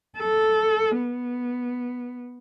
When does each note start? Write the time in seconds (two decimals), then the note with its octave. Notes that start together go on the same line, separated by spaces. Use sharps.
0.18 A4
0.98 B3